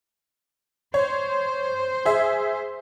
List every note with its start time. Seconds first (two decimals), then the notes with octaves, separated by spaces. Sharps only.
0.94 C5 C#5
2.05 G#4 E5